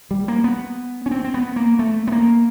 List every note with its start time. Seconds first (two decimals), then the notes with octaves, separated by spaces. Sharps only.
0.11 G3
0.28 A#3
0.44 B3
1.06 C#4
1.11 C4
1.24 C4
1.34 B3
1.56 A#3
1.79 A3
2.07 B3
2.12 A#3